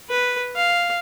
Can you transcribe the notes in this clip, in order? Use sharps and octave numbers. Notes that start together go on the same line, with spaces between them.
B4
F5